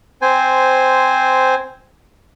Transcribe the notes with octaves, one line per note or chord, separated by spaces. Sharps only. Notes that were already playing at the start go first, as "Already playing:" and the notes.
C4 C5 G#5